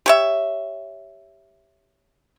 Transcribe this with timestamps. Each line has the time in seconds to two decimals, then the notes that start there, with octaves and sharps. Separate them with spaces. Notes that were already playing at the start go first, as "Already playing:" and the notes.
0.06 G4 C#5 E5